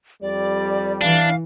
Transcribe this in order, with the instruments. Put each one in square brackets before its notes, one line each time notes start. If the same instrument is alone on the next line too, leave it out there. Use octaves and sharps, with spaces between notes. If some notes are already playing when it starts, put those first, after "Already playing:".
[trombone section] F2 G3 [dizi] D5
[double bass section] E3 [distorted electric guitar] D4 [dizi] F5